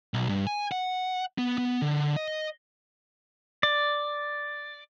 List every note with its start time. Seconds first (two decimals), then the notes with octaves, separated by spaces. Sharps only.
0.14 B1
0.29 G2
0.47 G#5
0.72 F#5
1.38 B3
1.58 B3
1.82 D3
2.16 D#5
3.63 D5